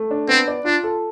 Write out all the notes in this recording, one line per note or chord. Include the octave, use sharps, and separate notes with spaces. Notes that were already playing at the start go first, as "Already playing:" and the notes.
Already playing: A3
D4
B3 C4
D5
D4 F4
A4